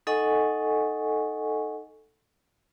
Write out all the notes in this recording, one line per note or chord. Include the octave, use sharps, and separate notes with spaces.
D#4 A4 D#5 F#5 G#5 C#6